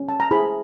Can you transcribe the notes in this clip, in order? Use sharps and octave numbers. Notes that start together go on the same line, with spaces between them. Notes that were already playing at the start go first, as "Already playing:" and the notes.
Already playing: C#4
A5
A#5
E4 G#4 C5 B5